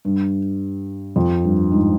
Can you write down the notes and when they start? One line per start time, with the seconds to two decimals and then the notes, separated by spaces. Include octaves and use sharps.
0.05 G2
1.16 F2
1.44 G2
1.72 G#2